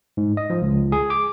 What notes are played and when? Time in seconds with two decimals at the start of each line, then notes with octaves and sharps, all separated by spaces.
0.17 G#2
0.37 D#5
0.50 F3
0.62 C#2
0.92 G#4
1.10 D6